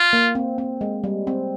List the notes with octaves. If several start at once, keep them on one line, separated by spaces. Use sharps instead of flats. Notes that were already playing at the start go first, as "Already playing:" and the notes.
Already playing: F4
A#3
C4
C4
G#3
G3
C4